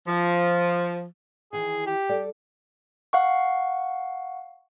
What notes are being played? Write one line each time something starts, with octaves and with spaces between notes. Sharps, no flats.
F3
D#3 E3 G#4
G4
G3 A4 D5
F5 F#5 C#6